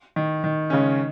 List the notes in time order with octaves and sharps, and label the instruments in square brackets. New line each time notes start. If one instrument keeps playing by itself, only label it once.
[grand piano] D#3
D#3
[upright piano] C#3 G#3 C#4